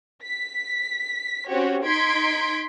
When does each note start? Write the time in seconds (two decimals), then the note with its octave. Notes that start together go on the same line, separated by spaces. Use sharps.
0.24 B6
1.48 C4 C#4 F#4 G4 C#5
1.84 D#4 C6 G#6 B6 D7